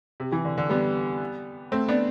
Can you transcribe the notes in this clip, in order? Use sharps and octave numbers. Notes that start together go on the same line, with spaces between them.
C3
C3 E3
D3
D3
G3 B3
A3 C4
B3 D4